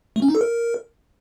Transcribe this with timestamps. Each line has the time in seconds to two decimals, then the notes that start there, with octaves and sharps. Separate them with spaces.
0.16 A3
0.22 C#4
0.28 D#4
0.35 A4
0.41 A#4